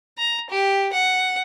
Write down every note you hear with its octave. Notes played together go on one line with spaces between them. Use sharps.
A#5
G4
F#5